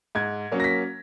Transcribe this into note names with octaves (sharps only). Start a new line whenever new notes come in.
G#2 G#6
F#3 A#3 C#4
A#6
B6